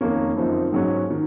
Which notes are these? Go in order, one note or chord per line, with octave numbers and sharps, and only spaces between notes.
F2 D#3 A#3 C#4
F#2 F3 C4 D#4
G#2 F#3 C#4
D#3